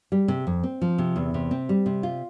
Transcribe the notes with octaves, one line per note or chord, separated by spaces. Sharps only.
G3
C3
F2
C4
F3
C3
E2
C3
C4
G3
C3
F4